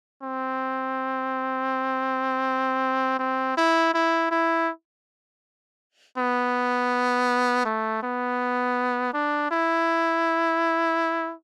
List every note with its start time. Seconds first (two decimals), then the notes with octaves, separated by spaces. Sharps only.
0.23 C4
3.19 C4
3.57 E4
3.94 E4
4.31 E4
6.18 B3
7.65 A3
8.03 B3
9.14 D4
9.51 E4